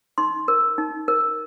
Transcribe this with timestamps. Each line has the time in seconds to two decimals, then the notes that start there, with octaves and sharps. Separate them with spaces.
0.18 D#4 C6
0.48 A#4
0.78 D#4
1.08 A#4